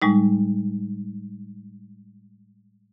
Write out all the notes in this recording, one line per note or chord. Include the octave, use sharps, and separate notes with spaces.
A2 G3 G#3 D#4